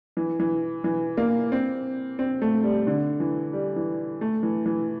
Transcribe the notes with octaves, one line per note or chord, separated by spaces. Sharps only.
E3
E3
E3
A#3
C4
C4
A3
G3
D3
E3
G3
E3
A3
E3
E3